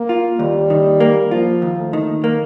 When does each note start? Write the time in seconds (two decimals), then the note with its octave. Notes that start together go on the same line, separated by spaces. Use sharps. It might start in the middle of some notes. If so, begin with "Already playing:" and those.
Already playing: A#3
0.09 F4
0.39 D#2 G3
0.70 D#3
1.00 A#3
1.31 F3 F4
1.62 D#2
1.78 A3
1.93 D#3
2.24 A#3